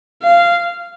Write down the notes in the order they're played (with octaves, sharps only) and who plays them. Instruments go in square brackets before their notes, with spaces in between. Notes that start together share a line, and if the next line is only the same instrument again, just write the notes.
[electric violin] F5